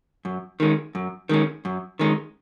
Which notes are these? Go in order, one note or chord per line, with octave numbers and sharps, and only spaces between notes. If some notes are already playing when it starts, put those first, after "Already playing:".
F#2
D#3 G#3 C#4
F#2
D#3 G#3 C#4
F#2
D#3 G#3 C#4